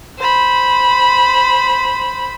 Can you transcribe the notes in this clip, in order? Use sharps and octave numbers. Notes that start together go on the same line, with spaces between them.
C5 B5